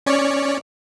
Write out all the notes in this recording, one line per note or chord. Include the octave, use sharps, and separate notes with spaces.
C#4 C#5 D5